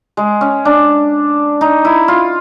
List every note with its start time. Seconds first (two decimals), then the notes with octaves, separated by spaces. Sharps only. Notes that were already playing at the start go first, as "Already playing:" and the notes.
0.17 G#3
0.41 C#4
0.65 D4
1.61 D#4
1.85 E4
2.08 F4